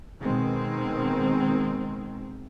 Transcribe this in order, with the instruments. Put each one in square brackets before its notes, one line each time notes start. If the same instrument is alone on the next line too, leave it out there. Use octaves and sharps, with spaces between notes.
[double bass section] B2 D#3 G#3 C4